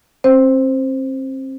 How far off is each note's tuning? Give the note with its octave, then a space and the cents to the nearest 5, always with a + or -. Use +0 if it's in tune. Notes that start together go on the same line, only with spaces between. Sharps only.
C4 +35 C5 +0